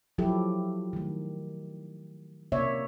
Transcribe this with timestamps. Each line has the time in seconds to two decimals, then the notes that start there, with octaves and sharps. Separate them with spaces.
0.18 F3 F#3 E4 G4 A4
0.93 D#3 A3
2.52 C3 A#3 C#5 D5 E5